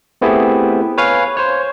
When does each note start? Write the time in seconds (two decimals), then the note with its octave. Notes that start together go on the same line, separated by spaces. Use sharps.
0.21 A3 B3 C4 E4 G4 G#4
0.98 B4 C#5 F5 G#5
1.37 C5 C#5